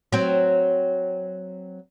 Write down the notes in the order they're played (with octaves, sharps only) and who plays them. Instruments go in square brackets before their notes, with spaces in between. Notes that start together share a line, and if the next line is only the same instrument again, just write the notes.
[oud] F#3 C4